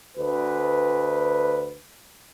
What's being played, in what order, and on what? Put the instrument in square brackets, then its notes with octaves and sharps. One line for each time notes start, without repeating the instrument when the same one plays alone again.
[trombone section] D2 B4